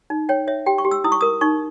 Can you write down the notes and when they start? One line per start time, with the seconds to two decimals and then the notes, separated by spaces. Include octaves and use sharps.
0.10 D#4
0.29 C#5 G5
0.47 C#5 E5
0.66 G4 G5
0.78 C#6
0.85 G4
0.91 E6
1.04 E4 D#6
1.12 C#6
1.21 A#4 D#6
1.41 D#4 C#6